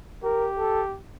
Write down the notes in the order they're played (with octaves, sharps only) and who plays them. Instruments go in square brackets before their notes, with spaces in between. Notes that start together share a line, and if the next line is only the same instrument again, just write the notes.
[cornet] G4 [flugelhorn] A#4
[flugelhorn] A4